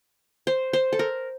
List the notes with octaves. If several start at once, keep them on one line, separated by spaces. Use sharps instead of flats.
C5
C5
A4
A#4